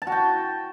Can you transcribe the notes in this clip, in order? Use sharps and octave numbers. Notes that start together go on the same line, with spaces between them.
A5
F#4
G5